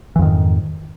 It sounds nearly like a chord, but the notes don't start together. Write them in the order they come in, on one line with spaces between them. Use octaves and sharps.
E3 F2 D#3 G#2